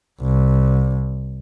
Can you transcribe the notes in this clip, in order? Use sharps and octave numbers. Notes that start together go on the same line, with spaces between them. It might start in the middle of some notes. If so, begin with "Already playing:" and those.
C2